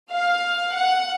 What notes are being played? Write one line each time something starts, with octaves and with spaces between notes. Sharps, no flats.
F5
F#5